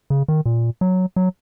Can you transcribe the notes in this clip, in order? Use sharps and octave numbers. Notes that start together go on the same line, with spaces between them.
C#3
D#3
A#2
F#3
F#3